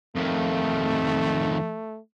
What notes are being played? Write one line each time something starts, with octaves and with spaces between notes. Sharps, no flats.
F2 D#3 A3